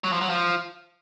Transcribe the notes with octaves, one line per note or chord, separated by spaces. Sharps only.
F#3
F3
F#3
F3